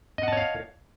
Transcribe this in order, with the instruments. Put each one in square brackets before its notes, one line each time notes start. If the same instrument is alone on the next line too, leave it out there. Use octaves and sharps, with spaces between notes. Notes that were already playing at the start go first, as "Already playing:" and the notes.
[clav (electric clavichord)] D#5
F#5
A5
C#5
F5